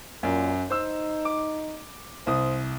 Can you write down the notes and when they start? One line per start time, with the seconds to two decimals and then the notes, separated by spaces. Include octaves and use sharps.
0.23 F#2 A#2
0.70 D#4 C5 E6
1.25 D6
2.27 C2 C5 D#6